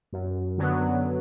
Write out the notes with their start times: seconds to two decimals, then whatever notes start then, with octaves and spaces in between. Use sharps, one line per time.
0.13 F#2
0.58 D3 F#3 B3